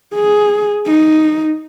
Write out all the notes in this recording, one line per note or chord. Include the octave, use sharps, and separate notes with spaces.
G#4
D#4